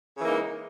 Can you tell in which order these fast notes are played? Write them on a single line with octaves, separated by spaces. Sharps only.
C#3 E3 A#3 D#4 G#3